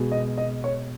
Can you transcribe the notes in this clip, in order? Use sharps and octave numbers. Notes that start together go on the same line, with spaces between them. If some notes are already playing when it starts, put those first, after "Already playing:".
Already playing: B2 G#3
D#5
D#5
C#5